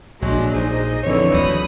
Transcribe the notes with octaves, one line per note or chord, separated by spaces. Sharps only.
A#1 F#3 G#3 D4
D#4 G#4 C5 D#5
F2 D3 E3 C#5
D2 F#3 B5 D#6